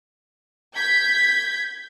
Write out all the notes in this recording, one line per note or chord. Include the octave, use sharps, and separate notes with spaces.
G6 G#6 B6